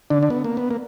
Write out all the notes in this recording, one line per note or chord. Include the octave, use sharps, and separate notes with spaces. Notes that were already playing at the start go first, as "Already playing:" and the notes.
D3 D4
D4
B3
A#3
B3
A#3